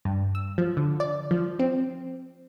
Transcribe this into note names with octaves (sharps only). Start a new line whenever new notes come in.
G2
E6
F3
D3
D5
F3
C4